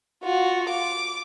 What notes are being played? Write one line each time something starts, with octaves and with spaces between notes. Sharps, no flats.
F4 F#4
D6